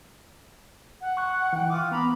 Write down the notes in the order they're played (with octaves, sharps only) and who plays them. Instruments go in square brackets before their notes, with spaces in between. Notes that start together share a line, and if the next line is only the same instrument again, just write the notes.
[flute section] F#5
[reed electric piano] C#6 F#6
E3 G5
[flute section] F4 D6 D#6
[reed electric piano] B3 [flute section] A#5 B5